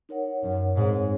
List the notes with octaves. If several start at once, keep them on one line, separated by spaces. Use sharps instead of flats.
D#4 A#4 C#5 F#5
F#2
G#2 C4 D#4 G#4 C#5